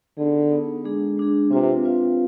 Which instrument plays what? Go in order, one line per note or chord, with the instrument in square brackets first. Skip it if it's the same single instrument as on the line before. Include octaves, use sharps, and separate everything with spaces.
[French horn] D3 [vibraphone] B3 D#4 G#4
[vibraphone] B3 D#4 G#4
G#3 D4 G#4
G#3 D4 G#4
[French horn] C3 [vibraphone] C4 F4 B4 F5
[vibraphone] C4 F4 B4 F5